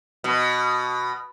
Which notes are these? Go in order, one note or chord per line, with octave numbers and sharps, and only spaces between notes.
B2